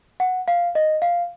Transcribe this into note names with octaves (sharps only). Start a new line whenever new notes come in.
F#5
F5
D#5
F5